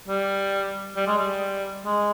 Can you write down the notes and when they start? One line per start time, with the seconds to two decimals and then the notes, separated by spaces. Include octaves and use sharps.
0.08 G3
0.96 G3
1.07 G#3
1.18 G3
1.85 G#3